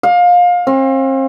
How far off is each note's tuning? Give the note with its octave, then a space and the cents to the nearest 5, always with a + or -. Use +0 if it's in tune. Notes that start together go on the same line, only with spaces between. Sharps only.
F5 +25
C4 +40